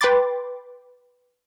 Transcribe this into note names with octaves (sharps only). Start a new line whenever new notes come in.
B4 G5 B5 C6 D6 A6